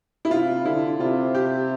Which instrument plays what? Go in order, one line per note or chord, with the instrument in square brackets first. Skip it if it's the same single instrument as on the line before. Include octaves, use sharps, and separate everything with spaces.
[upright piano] E4
[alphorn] C3 [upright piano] F4
[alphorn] D3 [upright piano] E4
[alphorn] C3 [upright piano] F4
[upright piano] G4